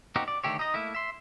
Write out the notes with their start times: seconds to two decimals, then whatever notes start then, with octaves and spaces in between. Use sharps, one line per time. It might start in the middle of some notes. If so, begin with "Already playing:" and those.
0.16 A#3 C4 D#4 F#4 G4
0.28 D5
0.44 D3 D#3 A3 G4 C#5
0.59 D#4 D#5
0.74 A3 A#3 E4
0.95 E5 C6